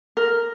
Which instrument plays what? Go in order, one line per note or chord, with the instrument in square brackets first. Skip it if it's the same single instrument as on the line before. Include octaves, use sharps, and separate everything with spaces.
[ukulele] A#4